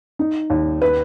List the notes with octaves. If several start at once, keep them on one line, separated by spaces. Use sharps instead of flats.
D#4
D#2
B4